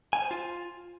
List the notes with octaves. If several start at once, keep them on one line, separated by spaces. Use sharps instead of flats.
G#5
C5
F4